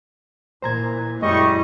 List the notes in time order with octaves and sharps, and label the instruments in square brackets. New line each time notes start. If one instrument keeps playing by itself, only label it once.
[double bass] A#2 E3 [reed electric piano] C5 A#5 G#6
[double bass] F#2 E4 [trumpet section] G3 D#5 C#6 [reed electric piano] G#3